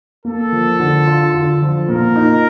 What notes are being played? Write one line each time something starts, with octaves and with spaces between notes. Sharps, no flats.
A#3 A4
F3
D3
F4
D3
F3
A#2 A#4
D#4